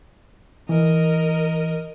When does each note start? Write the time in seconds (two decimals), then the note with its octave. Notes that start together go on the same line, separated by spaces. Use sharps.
0.69 E3 A#4 D#5